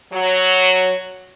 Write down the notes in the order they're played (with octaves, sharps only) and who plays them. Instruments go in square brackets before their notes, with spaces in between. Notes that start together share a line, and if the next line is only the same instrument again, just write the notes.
[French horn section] F#3